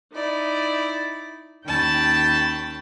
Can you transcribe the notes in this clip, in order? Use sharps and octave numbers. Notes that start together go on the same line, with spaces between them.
D#4 E4 D5
D#2 C#4 G5 A5 B5